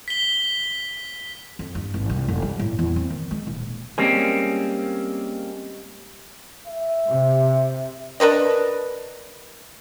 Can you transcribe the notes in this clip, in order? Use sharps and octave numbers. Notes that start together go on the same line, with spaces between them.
B6 G7
F2
G2
G#1
C2
F1
G3
A2
E2
C4
D#3
G#3
D#1
G3 G#3 A#3 C4 C#4 G#4
E5
C3
D4 A#4 B4 D#5